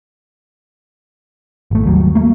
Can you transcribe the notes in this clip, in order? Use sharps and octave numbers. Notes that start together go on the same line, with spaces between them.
G#1 A3
D#2 F#3 G3
A3 A#3